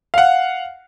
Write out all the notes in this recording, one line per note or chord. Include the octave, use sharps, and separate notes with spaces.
F5 F#5